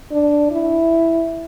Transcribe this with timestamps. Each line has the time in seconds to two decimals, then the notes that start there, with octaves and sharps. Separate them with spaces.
0.11 D4
0.52 E4